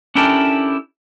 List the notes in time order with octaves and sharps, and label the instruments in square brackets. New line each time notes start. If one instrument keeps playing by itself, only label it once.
[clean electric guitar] C#4 D4 E4 G4 A4 A#4